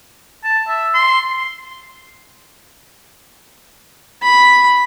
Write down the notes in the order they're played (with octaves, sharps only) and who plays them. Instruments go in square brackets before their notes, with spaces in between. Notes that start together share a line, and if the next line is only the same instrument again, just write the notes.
[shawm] A5
E5
C6
[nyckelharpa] B5